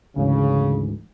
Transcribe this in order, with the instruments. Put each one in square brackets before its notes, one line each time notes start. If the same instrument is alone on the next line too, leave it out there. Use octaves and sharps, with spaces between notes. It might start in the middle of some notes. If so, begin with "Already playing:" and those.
[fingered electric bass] D2 G#2 E3 [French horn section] C#3